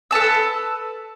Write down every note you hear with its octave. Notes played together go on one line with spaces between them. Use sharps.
A4 B4 A5 E6